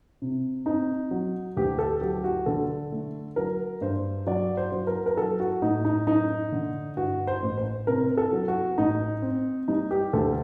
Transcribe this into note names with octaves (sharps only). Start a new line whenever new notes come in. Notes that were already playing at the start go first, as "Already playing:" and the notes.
C3
C4 D#4
F#3
D2 G4
A4
F#3 G4
F#4
D3 A4
A3
F#3 A#4
G2 C5
F#3 D5
C5
F#3
A#4
A#4
F#3 A4
F#4
A2 D#4
D#4
F#2 D#4
D3
G2 F#4
C5
A1
C5
C3 A#4
A4
F#3
F#4
A1 D#4
C4
G3 D#4
G4
D2 A4